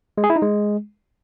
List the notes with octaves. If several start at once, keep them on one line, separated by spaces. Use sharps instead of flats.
G#3
G#4
E4
D#4
G#3